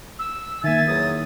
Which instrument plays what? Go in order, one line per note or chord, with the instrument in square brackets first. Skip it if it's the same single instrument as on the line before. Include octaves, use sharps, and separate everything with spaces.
[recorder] E6
[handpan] D#3 A#3 [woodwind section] E5 G#5 [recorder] A6
[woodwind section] E2 F#3 D#6